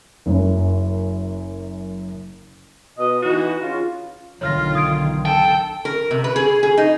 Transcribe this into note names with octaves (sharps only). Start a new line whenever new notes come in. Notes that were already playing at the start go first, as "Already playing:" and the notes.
F#1 F#2
B2 D#5
E3 D#4 F#4
C#3 F4
B1 D3 D#3 F4 C#5 F6 A#6
D#6 G#6 D7
A4 G5
A#4
C3
B4
G#4
G#4
D#4